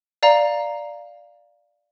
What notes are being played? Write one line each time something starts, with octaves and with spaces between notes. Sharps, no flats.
D5 F5 A#5